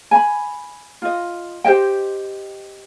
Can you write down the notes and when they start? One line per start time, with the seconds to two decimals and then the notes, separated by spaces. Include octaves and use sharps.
0.11 G#5 A#5 B5
1.02 F4 D#5
1.64 G4 C5 D#5 G5